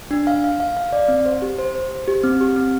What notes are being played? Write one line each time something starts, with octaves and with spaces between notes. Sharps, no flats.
D4
F5
F5
F5
F5
D5
C4
C5
G4
C5
C5
C5
G4
C4
G4
C4